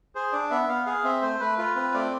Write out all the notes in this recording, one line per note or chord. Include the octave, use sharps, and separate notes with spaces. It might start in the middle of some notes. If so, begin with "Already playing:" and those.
G#4 C5
D4 D5
B3 E5
B3 F5
G#4 F5
C4 E5
A3 C5
A3 B4
F4 B4
C4 B4
A3 D5